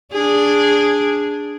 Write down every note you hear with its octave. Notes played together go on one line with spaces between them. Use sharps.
D4 G#4